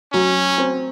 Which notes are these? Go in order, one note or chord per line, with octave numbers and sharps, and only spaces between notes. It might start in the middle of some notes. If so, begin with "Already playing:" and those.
F#3 C#4
C4